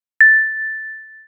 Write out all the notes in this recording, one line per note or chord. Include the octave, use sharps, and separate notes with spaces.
A6